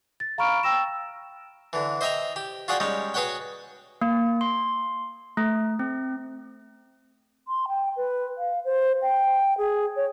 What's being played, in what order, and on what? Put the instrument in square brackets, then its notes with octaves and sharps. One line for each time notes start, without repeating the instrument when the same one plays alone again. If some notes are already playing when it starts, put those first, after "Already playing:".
[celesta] A6
F5 A#5 B5 C#6 F6 D7
G5 E6 A#6 E7
[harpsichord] D3 E3
C5 D#5 E5 G5 A#5
G4
F4 F#4 G#4 D5 F#5 G5
G3 G#3 C#4 D#4
F#4 G#4 B4 C#5 F#5 G5
[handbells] A#3
C6
A3
C4
[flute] C6
G5
B4
F5
C5
G5
G#4
C#5